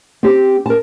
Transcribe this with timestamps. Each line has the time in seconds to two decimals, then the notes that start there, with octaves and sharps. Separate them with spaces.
0.23 C4 G4
0.66 A#4 A5